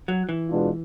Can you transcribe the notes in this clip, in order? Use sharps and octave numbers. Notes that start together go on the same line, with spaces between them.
F#3
E3
B2 G#3 B3 D4 F4